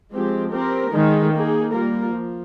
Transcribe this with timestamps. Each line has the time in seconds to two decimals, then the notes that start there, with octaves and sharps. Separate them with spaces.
0.12 F3 G#3 C4 G4
0.52 C4 G4 A#4
0.93 D#3 G#3 D#4
1.33 A#3 D#4 G#4
1.73 G3 A#3 F4 A#4
2.13 F3